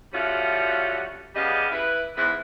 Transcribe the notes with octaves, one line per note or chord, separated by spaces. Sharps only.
F3 G3 A3 C#4 F4 F#4
C#3 G3 B3 G4 D#5 F5
E4 B4
E2 G#2 E4 B4